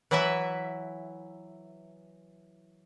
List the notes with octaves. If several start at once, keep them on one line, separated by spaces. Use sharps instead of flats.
E3 F#3 E4 B4 E5